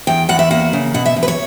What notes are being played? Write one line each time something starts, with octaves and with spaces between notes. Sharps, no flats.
E2 G5
E2 F#5
E5
A#3 F#5
C#3
B2 F#5
E5
E2
B4
C#5